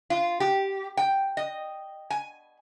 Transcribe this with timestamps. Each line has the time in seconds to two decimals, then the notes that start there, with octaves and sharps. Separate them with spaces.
0.10 F4
0.40 G4
0.97 G5
1.37 D#5
2.10 G#5